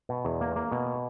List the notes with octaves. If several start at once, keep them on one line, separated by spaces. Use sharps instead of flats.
B2
E2
A#3
A#3
B2